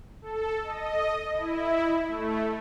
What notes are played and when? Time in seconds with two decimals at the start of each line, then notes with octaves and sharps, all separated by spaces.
0.22 A4
0.63 D#5
1.33 E4
2.07 A3